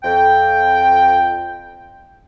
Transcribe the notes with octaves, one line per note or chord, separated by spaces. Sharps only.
F2 G5